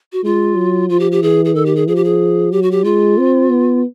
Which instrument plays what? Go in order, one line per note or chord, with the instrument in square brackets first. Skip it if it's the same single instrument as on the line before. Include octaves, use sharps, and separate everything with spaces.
[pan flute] F#4
[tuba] G#3 [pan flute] F4
[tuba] F#3
[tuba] F3 [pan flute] F4
[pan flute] G4
G4
[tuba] E3 [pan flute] G#4
[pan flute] G#4
[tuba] D#3 [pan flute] A4
[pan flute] G4
G#4
[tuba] F3 [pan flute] G#4
[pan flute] G4
G#4
[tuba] F#3 [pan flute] G4
[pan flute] F#4
G4
[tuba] G#3 [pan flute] F4
[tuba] C4
B3